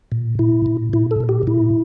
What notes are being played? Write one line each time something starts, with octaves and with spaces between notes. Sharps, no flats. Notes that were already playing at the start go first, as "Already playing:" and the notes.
A#2
A#2 E4
A#2
A#2 E4
A4
A#2
G4
A#2 E4